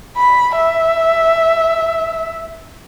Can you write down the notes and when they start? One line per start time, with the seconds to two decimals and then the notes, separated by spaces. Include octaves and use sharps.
0.17 B5
0.57 E5